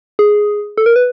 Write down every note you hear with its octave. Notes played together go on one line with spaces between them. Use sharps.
G#4
A4
A#4
B4